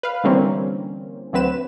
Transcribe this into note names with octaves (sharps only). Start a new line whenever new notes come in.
B4 F5
D3 E3 G3 A#3 C4 C#4
D2 F#3 C4 B4 E7